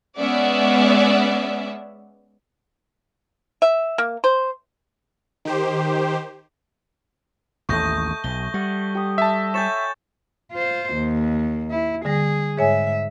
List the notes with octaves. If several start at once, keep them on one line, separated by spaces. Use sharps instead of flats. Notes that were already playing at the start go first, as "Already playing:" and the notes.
G#3 B3 C#4 D5 E5 F#5
E5
A#3
C5
D#3 G4 C5
A1 D#2 A3 D#5 C#6 G6 A#6
B1 G7
G3 F#5
G4 D#6
E5 A5
C#5 G#5 G6 A6 E7
F4 C5
D#2
E4
D3 G3 G#4 A#6
G#2 G#4 C#5 E5 G#5